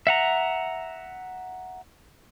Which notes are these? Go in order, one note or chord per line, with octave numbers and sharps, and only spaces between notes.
E5 F#5 A#5